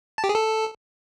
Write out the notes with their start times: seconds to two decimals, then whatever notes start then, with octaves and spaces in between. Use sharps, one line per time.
0.18 A5
0.24 G4
0.29 G#4
0.35 A4